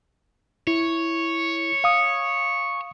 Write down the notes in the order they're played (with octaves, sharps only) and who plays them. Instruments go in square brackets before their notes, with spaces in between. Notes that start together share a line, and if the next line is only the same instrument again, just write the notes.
[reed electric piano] E4 [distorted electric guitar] C#5
[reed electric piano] F5 D#6